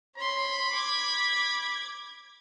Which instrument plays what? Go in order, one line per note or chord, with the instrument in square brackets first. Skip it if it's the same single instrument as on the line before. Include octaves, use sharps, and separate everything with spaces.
[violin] C#5 C6 [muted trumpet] B5
[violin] D6 G#6